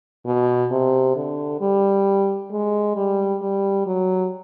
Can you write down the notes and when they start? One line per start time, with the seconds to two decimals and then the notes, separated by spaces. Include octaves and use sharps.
0.26 B2
0.71 C3
1.16 D3
1.61 G3
2.51 G#3
2.96 G3
3.42 G3
3.86 F#3